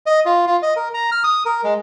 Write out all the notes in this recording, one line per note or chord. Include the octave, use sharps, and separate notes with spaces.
D#5
F4
F4
D#5
A#4
A#5
F6
D#6
A#4
G#3